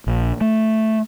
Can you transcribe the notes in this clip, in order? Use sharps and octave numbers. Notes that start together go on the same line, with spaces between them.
A#1
A3